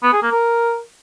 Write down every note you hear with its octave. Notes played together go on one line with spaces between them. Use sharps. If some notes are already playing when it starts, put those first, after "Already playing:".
B3
G#4
A#3
A#4